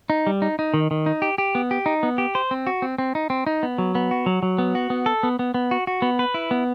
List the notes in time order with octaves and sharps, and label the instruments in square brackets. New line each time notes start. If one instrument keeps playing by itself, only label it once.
[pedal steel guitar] D#4
G3
D#4
D#4
D#3
D#3
D#4
G4
G4
B3
G4
D#4
B3
G4
C5
C4
F#4
C4
C4
D#4
C4
D#4
B3
F#3
B3
F#4
F#3
F#3
B3
F#4
B3
A4
B3
B3
B3
F#4
F#4
B3
B4
E4
B3